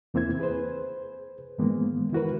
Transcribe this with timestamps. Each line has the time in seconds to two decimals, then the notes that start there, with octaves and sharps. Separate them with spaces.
0.14 E2 A#3 C4 E4 G#6
0.39 G#4 B4 C5
1.58 G#2 D#3 E3 G#3 A#3 B3
2.13 E4 F#4 A#4 B4